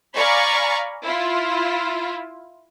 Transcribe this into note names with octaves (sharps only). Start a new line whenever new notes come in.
D5 F5 G#5 A#5 B5 C#6
E4 F4